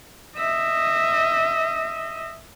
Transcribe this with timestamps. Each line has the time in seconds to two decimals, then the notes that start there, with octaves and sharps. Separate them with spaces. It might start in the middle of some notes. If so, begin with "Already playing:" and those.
0.37 D#5 E5